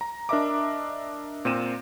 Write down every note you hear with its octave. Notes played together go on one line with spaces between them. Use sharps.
A#5
D4 A#4 D#5 E5 A#5 D6
A#2 C4 A#4 D#7 E7